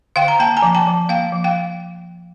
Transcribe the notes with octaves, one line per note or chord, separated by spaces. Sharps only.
D3 F5 G5
A#5
A#3 G5 A5
G#5 A#5
F3
G5 A5
F3
A#3 F5 G5
F3
F5 G5